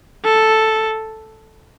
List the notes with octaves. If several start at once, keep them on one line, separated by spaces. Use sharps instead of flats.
A4